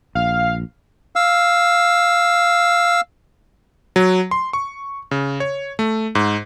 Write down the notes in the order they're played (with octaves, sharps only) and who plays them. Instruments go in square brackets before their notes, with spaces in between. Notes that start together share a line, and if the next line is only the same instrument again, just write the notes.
[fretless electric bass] A#1 [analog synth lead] F5
[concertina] F5 E6
[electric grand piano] F#3
C6
C#6
C#3
C#5
A3
G#2